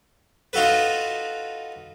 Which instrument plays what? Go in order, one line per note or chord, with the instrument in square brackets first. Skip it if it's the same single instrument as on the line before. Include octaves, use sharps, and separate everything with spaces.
[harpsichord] D#4 F4 F#4 A4 B4